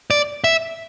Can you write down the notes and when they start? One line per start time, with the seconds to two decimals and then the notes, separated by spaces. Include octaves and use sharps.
0.10 D5
0.44 E5